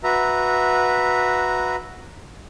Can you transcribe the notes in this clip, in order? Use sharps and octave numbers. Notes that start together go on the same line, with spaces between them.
F#4 B4 E5 A#5